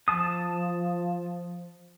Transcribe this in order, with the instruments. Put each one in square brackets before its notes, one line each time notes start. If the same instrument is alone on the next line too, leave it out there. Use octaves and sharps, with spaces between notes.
[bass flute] F3 [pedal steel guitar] A5 D#6